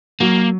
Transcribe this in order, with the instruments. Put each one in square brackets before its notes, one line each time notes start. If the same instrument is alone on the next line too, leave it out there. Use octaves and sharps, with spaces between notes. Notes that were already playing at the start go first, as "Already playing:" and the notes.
[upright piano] F#3 [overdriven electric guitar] A#3